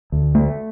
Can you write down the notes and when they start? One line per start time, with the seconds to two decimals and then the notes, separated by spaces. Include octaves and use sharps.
0.12 D2
0.35 A3